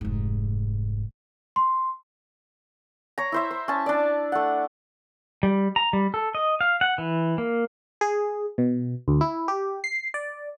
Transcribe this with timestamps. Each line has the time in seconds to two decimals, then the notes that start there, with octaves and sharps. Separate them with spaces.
0.01 F1 G#2
1.56 C6
3.18 C#5 A#5
3.32 E4 C5 E5
3.51 C5
3.68 C#4 A5
3.86 D4 D5
4.32 A3 F#5
5.43 G3
5.76 A#5
5.93 G3
6.14 A4
6.35 D#5
6.61 F5
6.81 F#5
6.98 E3
7.38 A#3
8.01 G#4
8.58 B2
9.08 D2
9.21 E4
9.48 G4
9.84 C7
10.14 D5